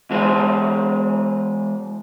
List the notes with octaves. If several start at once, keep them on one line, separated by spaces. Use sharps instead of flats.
E3 G#3 C5